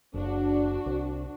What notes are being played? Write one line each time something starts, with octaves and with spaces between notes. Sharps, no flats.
F#1 D4 F#4
C2